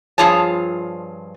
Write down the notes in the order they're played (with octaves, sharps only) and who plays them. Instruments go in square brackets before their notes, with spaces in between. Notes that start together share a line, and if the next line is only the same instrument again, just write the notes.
[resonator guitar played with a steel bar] G2 F3 F4 G#4 C#5 A5